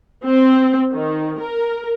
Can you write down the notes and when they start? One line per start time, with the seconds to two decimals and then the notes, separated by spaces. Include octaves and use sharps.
0.24 C4
0.92 D#3
1.40 A#4